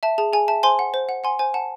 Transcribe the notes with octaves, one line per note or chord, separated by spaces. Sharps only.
E5 A5
G#4 A5
G#4 G#5
E5 A5
C5 G#5 C6
F#5
C5
F#5
F#5 G#5 C6
C5 G#5
F#5 A5